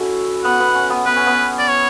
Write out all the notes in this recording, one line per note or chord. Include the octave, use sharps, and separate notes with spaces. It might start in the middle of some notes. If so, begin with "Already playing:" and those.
Already playing: C#4 E4 F#4 A4
B3 F#5
B3
C#4
B3
B3 B4
C#4
B3
D5
C#5